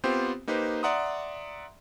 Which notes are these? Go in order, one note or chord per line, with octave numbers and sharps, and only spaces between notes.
B3 C4 F4 G4 C5
A#3 D#4 G4 B4 C5
D5 E5 F#5 A#5 C6 D#6